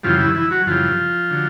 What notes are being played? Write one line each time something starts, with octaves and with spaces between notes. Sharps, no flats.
F#2 C#3 E3 F3 G3 F4
E3 E4
E3 E4
F#3 F#4
F#2 C#3 E3 F3 G3 F4
D3 F#3